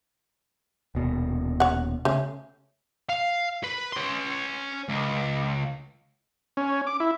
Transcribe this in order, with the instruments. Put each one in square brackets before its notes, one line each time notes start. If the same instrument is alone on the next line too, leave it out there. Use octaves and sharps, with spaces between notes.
[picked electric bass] D#1 B2
[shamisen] C#5 F#5
[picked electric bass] C#3 [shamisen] A3 C#4
[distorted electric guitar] F5
B4
C#4 C6
C#2
[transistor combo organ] C#4
D6
E4